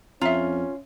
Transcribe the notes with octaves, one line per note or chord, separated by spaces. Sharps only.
F2 C#4 F4 E5 A#5